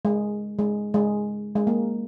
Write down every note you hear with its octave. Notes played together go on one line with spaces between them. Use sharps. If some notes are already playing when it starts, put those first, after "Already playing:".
G#3
G#3
G#3
G#3
A#3